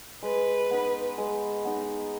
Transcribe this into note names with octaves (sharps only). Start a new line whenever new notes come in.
G#3 B4
B3 D#4
G#3
B3 D#4